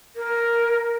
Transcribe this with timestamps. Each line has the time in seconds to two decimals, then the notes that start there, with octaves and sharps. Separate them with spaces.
0.16 A#4